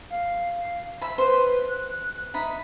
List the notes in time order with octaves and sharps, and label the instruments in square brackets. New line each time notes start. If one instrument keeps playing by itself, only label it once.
[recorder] F5
[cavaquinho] E5 B5
[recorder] B4 [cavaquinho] C5
[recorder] F#6
[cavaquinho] D#4 B5 [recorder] E5